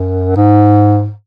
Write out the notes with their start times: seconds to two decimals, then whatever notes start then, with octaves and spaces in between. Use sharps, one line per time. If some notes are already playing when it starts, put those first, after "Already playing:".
Already playing: F#2
0.36 G#2